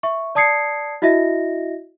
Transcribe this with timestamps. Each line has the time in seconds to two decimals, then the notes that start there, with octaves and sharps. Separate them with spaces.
0.03 E5 C#6
0.35 D5 A5 D#6 G#6 C7 C#7
1.02 E4 F#4 D#5 E5 A#6